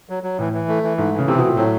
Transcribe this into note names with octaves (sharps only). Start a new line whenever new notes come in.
F#3
F#3
A2 E3
E3
A3
E3
G#2 A3
C#3 E3
C3 C4
B2 A3
A#2
A2 F#3